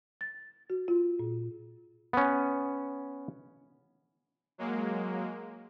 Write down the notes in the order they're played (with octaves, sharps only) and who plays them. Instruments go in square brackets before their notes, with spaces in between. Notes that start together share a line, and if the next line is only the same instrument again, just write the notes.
[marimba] A6
F#4
F4
A#2
[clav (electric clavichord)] B3 C#4
[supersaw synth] F#3 G#3 A#3